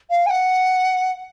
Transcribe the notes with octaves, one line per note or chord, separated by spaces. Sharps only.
F5
G#5
F#5